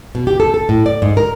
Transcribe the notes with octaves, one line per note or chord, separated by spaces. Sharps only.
B2
G4
A4
A4
A2
D5
G#2
A#4